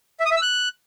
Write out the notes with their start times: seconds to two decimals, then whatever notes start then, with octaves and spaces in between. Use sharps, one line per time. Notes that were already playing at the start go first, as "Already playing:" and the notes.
0.20 E5
0.26 D#6
0.31 E5
0.36 E6
0.42 F#6